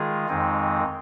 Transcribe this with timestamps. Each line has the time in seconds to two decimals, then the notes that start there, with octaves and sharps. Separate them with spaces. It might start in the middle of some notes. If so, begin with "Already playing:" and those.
Already playing: D#3 G#3 F4 G#4
0.28 F2 D#3 G#3 C4 D#4